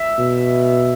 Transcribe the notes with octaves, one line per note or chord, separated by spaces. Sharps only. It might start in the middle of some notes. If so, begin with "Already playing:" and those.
Already playing: E5
B2